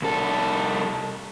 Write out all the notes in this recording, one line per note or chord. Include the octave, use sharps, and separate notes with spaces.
C2 A4